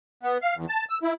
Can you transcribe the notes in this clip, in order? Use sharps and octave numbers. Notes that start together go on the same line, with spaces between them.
B3
F5
E2
A5
E6
E4